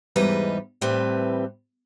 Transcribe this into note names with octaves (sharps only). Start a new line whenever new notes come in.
E2 G#2 G3 B4 D#5
A2 E3 G3 C4 B4